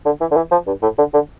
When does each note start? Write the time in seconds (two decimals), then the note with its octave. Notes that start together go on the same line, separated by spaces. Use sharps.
0.05 D3
0.21 E3
0.31 D3
0.36 E3
0.52 F3
0.67 G2
0.82 A2
0.98 D3
1.14 D3